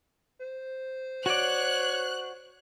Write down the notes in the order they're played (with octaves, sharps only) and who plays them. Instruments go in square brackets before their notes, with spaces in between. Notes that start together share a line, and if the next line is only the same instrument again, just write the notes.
[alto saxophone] C5
[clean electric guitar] F#4 D5 [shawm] C#5 [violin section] F#6